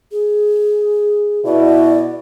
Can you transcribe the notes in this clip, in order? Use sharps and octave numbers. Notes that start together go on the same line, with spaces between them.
G#4
B2 E4 F#4 D5